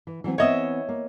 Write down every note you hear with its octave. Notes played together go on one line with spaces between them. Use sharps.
E3
E3 F#3 C4
E3 B3 C4 C#5 D#5 E5
A#3